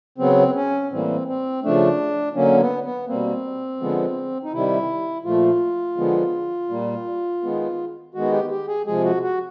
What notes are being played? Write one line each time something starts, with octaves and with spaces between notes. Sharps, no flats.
C#3 F#3 B3 C4
C#4
A2 E3 G3 A#3 C4
C4
C#3 F3 A3 D4
D3 F#3 A#3 C#4
B3
B3
B2 G3 A#3 C4
D3 F3 G#3 B3
D#4
C3 D#3 G3 E4
A#2 F3 A3 F4
D3 F3 G#3 B3
A#2 G3 A#3
D#3 G#3 B3
D#3 G#3 B3 F#4
G4
G4
G#4
C3 F3 G#3 G#4
F#4
F#4